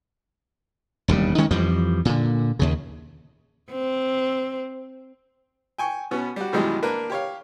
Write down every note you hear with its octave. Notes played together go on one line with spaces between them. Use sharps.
E1 D#2 C#3 G3
D#3 G#3 C#4
F2 E3 F3 G3
A#2 D3
D#2 C#3
C4
G5 G#5 C#6
B2 B3 C#4
G3 F#4
F#2 B2 D#3 E3 G3 G#3
A#3 D4 A#4 B4
G4 C#5 F5